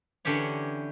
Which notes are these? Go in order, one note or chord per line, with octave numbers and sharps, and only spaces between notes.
D3 E3 C#4 G4 C#5